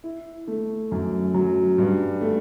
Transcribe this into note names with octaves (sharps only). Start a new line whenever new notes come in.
E4
A3
F#2
F#3
G2
A3